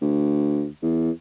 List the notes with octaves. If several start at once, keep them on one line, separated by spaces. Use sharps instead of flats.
D2
E2